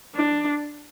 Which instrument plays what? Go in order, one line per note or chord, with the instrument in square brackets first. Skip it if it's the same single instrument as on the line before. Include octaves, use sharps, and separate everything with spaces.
[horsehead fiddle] D4